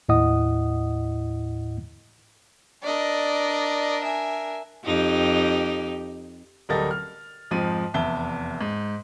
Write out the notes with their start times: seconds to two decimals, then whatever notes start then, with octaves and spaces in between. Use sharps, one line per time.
0.09 D#2 A2 E4 D#5 F#5 D#6
2.83 D4 A#4 D5 D#5
4.04 E5 G#5
4.85 F2 D#4 G4
6.69 D1 G3 A4 A#4 D#5 A6
6.91 F6
7.51 F2 G#2 F3 D#7
7.94 F1 E2 E5 A5 G7
8.61 G#2